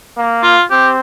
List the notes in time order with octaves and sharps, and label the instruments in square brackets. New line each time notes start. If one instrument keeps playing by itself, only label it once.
[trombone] A#3
[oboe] F4
[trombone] C4 [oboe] G4